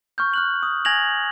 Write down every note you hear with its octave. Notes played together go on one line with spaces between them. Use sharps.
C#6 F6 G6
F6 F#6 F#7
D#6
G#5 G#6 A#6 F7 F#7